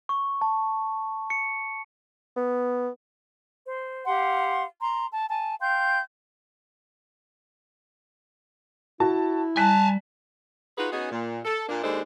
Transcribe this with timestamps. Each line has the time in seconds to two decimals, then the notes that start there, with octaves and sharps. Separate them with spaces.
0.09 C#6
0.41 A5
1.30 C#7
2.37 B3
3.66 C5
4.06 G4 F5 F#5 C6
4.81 A#5 C6
5.12 A5
5.30 G#5 A5
5.60 F5 G5 C6 G6
9.00 E4 F#4 A5
9.57 G3 G#5 A5 F#6 B6
10.78 D#4 F4 F#4 G#4 B4
10.92 B3 C#4 D#4 F#4 G#4
11.11 A#2
11.45 A4
11.69 A#2 A#3 D4
11.83 D#2 G#3 D4 D#4 A4 C5